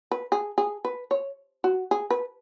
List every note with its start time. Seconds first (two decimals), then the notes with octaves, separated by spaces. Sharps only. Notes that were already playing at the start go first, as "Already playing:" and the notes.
0.11 B4
0.32 G#4
0.58 G#4
0.85 B4
1.11 C#5
1.64 F#4
1.91 G#4
2.10 B4